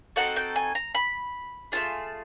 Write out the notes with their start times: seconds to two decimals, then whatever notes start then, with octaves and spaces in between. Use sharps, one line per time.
0.16 C4 D#4 F#4 A4 F#5
0.36 G5
0.56 G#5
0.75 A#5
0.95 B5
1.72 A3 C#4 F4 G#4 A5